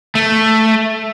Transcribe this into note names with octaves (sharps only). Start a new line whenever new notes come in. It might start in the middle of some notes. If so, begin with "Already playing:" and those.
A3